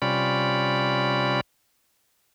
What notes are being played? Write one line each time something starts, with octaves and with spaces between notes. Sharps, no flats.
C3 G3 C#4 F4 D5 B5